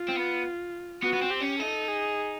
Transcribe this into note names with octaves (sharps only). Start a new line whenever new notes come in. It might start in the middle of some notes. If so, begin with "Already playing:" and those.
Already playing: F4
C4
B3
B3 F#4
B3
C4
G4
C#4
D#4 A4
G#4